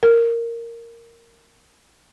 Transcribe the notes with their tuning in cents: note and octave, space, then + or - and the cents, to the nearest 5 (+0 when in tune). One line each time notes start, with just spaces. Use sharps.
A#4 -10